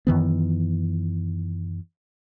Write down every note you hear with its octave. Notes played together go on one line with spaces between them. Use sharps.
F#2 D#3 E3 B3